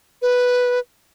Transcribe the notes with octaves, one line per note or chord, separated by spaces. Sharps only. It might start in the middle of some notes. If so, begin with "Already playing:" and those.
B4